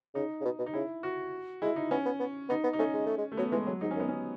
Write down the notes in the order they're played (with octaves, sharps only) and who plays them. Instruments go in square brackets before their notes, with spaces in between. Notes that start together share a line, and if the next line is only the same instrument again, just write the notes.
[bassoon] C#3 [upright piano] D#4
[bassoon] C#3
B2
B2
[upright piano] D#4
[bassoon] C#3 [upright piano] E4
[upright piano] F#4
[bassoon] G#3 [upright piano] E4
[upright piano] D#4
[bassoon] B3 [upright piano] C#4
[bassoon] B3
B3
[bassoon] B3 [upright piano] D#4
[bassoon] B3
[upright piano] D#4
[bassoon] A3 [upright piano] C#4
[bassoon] G#3
A3
G#3
[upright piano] A3
[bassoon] F#3 [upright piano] B3
[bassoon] E3 [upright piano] G#3
[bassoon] C#3 [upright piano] F#3
[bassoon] G#2 [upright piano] D#4
[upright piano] C#4
[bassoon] F#2
[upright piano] B3
C#4